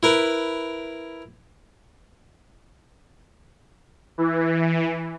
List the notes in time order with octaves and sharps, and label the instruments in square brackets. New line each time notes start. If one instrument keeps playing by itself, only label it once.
[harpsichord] E4 A#4 B4
[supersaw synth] E3